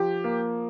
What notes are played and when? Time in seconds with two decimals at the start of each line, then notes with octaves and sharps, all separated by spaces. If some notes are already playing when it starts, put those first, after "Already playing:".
Already playing: F3 G4
0.24 A#3